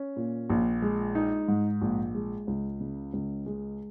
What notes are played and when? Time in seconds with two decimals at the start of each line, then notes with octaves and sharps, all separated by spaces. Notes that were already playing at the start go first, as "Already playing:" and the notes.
Already playing: C#4
0.16 A#2
0.50 A#1
0.82 G#3
1.15 D#4
1.48 G#2
1.81 A#1
2.15 G#3
2.47 C#2
2.80 C#3
3.13 C#2
3.46 G#3